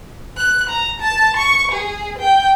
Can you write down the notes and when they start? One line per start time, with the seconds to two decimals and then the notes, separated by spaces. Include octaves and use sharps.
0.37 F#6
0.70 A#5
1.00 A5
1.37 C#6
1.72 G#4
2.19 G5